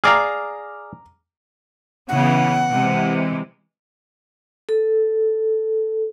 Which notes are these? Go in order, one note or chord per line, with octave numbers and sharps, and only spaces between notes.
G#4 D5 F5 A#5 D6 F6
C#3 E3 B3 F#5
C3 E3 G#3
A4